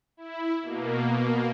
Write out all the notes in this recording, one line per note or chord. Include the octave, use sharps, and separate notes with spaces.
E4
B2 A#3